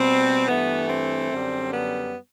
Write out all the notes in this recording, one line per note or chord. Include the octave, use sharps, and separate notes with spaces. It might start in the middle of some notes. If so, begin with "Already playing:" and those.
Already playing: B2 G3 C4
G2 E3 A3 B3
C4
F#2 D3 G3
B3